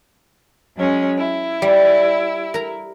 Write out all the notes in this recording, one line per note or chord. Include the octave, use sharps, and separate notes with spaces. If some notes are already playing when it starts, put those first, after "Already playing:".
F#3 G#3 C#4
E4
G3
A#4 A#5